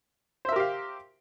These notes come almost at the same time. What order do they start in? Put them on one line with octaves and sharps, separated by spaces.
C5 E5 A#4 G4 F5